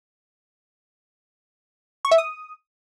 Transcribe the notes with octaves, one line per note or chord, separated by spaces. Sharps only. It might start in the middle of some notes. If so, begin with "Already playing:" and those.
C#6
E5
D#6